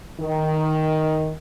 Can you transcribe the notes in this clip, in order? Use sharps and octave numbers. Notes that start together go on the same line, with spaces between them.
D#3